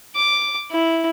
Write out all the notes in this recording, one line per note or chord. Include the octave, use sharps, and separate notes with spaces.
D6
E4